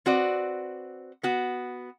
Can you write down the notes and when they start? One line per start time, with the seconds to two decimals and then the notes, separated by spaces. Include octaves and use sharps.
0.06 C4 F#4 B4 D5
1.23 B3 F#4